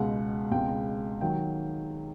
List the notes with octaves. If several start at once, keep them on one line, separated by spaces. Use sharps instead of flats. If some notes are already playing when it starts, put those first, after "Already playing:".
Already playing: C#2 B2 G#3 F#5
C#2 B2 G#3 C4 G5
D#3 F#3 G5